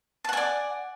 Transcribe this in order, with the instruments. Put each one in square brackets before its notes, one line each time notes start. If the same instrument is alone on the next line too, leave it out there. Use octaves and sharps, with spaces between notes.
[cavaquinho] A5
F#5
G#5
D5